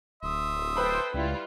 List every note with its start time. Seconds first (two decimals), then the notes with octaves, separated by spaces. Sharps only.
0.23 D1 E5 C6 D#6
0.77 A4 B4 C5 G5 B5
1.14 C#2 G3 E4 F4